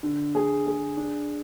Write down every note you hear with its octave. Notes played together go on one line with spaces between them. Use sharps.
D3
G#4
G#4
D4